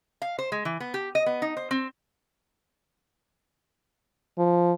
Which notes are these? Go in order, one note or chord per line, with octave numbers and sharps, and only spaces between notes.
F5
C5
G#3
E3
B3
G4
D#5
B3
D#4
C5
C4
F3